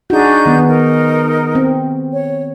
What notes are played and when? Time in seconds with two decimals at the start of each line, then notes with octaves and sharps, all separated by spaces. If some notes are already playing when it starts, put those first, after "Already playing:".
0.10 D4 D#4 F#4 G#4 G6
0.46 D#3 B3
0.67 D#4 A#4
1.55 C4
2.13 C#5